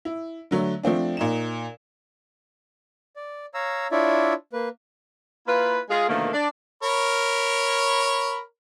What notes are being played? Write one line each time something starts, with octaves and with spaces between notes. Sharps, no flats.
E4
D3 F#3 A3
F3 A3 C4 D4
A#2 D#4 E7
D5
C#5 F5 A#5 E6
D4 E4 F4 C#5 D5 E5
A#3 B4
A#3 E4 F4 B4
G#3 F4 G#4
B2 D3 D#3 F3 A3 A#3
D4 D5
A#4 C#5 B5